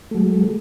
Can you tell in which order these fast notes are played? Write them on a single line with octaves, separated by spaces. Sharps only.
A3 F#3 G#3